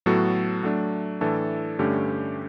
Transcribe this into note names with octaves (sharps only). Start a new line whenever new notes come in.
A2 F#3 B3 F#4 A4
F#3 A3 D4
A2 E3 A3 D4 A4
G2 D3 A3 C#4 G4